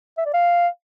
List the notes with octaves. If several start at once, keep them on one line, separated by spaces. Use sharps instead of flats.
E5
D5
F5